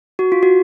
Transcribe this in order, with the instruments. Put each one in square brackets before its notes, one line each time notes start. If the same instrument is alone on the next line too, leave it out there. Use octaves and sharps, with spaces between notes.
[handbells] F#4
F4
F#4